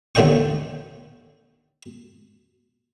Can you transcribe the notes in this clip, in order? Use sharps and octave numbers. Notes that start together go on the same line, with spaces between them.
D#2 A2 D3 D5 G5 C#6